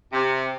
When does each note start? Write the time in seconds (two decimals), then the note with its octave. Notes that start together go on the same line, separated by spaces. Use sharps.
0.13 C3